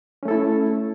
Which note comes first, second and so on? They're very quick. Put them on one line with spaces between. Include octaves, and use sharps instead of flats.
C#4 A3 A4 E4